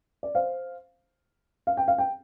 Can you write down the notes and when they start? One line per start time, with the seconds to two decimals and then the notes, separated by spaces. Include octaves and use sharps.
0.23 D5
0.35 C5 F5
1.67 F5
1.77 G5
1.88 F5
1.98 G5